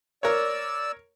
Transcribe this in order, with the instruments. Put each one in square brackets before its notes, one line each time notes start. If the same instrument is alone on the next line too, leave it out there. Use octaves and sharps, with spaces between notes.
[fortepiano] A#4 C#5 [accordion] D5 E6